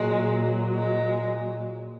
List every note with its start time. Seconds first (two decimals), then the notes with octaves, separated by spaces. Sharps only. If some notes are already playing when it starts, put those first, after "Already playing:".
Already playing: A#2 F#3 G#3
0.74 G#3